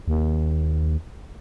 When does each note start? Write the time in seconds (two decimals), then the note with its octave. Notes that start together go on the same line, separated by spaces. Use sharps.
0.08 D#2